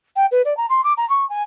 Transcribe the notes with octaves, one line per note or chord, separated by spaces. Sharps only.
G5
B4
D5
A#5
C6
D6
A#5
C#6
G#5